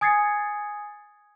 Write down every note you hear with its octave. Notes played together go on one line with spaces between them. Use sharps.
G#5 D#6 G#6 A6 C7 C#7